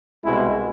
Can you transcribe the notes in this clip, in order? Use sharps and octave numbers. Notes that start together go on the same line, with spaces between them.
C2 B2 G#3 E4